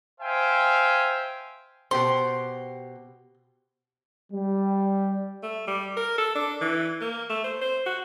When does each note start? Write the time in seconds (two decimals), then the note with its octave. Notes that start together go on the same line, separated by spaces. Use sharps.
0.21 C5 E5 F5 G5 G#5
1.91 B2 G4 C5 C6
4.31 G3
5.43 A3
5.67 G3
5.97 A#4
6.18 A4
6.35 D4
6.61 E3
7.01 A#3
7.30 A3
7.44 C5
7.61 C5
7.86 F#4